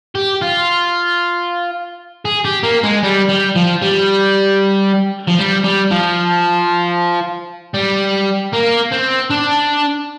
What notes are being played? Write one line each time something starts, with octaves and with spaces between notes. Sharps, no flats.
G4
F4
G#4
G4
A#3
G#3
G3
G3
F3
G3
F3
G3
G3
F3
G3
A#3
C4
D4